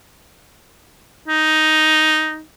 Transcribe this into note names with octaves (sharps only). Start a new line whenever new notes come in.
D#4